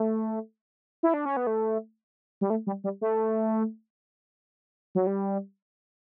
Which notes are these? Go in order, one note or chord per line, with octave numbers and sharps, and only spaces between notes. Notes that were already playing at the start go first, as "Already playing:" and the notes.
Already playing: A3
E4
D4
C#4
B3
A3
G3
A3
G3
G3
A3
F#3
G3